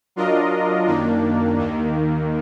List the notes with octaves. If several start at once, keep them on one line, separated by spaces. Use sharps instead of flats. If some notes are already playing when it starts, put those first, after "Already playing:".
F#3 D4 F4 A#4 D#5
F#2 D#3 A#3 D4
D#2 D#3 A#3